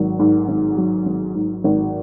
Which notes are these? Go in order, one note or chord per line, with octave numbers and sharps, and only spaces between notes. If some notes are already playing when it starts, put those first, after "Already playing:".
Already playing: G#1 F#3
G#2
G#1
F#3
G#1
G#2
G#1